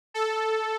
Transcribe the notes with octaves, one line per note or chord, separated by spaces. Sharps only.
A4